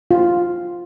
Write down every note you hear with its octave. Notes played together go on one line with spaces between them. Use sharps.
F4